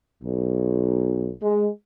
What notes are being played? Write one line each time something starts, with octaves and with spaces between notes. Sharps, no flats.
B1
G#3